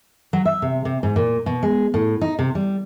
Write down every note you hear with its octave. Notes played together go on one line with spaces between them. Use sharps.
F#3
E5
C3
C3
G#2
A#2
B2
G#3
A2
D#4
C3
G3